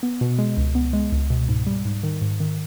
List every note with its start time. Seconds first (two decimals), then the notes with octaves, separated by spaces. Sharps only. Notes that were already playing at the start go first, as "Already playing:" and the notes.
0.03 B3
0.21 B2
0.38 G#3
0.57 C#2
0.75 B3
0.93 G#3
1.12 C#2
1.30 B2
1.49 G#2
1.67 G3
1.85 G#2
2.03 D#3
2.21 G#2
2.40 D#3